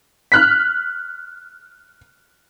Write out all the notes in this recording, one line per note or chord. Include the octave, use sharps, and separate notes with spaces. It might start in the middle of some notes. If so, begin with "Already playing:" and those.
F6 F#6 B6